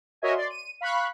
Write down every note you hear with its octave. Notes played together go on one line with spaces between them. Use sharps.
F#4 A#4 C#5 D#5 E5 G#5
D5 C6
D#7
F5 B5 C#6 F#6